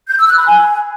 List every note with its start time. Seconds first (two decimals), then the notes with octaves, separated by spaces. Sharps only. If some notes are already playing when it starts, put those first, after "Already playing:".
0.09 G6
0.19 E6
0.28 F#6
0.38 B5
0.48 G#5